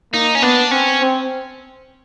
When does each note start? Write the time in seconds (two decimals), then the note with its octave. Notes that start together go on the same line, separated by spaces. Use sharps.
0.13 A#3 D#4
0.35 C#4
0.42 B3 D4
0.71 C4 C#4
1.01 C4